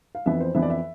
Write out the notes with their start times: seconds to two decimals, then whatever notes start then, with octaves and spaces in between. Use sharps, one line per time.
0.15 F5
0.26 F2 E3 B3 E5
0.40 C5
0.54 F2 E3 B3 E5
0.62 D5
0.70 E5